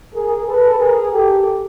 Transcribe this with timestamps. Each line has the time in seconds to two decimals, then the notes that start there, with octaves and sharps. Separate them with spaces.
0.14 G#4 A#4
0.47 A4 B4
0.80 G#4 A#4
1.13 G4 A4